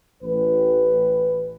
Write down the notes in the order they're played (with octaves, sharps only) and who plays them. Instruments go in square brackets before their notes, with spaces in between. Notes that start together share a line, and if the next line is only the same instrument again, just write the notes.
[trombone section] A1 B4